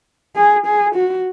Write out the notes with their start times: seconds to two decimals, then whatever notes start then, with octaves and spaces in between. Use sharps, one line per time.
0.36 G#4
0.66 G#4
0.95 F#4